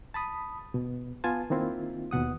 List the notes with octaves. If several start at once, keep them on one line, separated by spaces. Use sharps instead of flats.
A5 B5 D#6
B2
B3 F4 G#5 A5
D#3 A#3 C4 E4 F4
D#2 B2 F#5 D#6